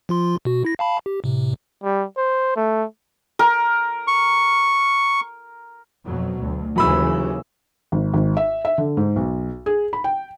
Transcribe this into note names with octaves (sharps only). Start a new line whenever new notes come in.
F3 F4 C6
B2 F#4
E4 A#6
F5 A5 B5
G4
A2 C3
G3
C5
A3
A#4
C#6
F2 B2 F#3
D2
D#2 C#3 E3 F#3 B5 E6
G#1
G#1
E5
E5
D3
G#2
B1
G#4
B5
G5